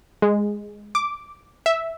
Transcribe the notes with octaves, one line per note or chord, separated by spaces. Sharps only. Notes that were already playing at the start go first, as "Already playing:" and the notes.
G#3
D6
E5